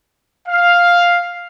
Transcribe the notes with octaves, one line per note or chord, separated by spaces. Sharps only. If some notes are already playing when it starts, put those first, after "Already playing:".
F5